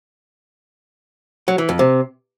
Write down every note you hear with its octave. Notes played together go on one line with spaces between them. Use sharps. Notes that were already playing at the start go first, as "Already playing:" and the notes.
F#3
E3
F2
C3